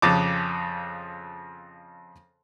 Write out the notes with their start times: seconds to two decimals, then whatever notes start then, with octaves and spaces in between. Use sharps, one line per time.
0.02 F2 C#3 A5 D6